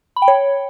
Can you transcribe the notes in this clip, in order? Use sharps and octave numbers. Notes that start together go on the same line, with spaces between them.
B5
G5
C#5